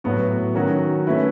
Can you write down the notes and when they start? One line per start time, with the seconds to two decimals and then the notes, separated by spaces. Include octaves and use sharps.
0.04 A2 F#3 B3 F#4
0.55 D#3 F#3 C#4 F#4
1.07 A3 C#4 E4 B4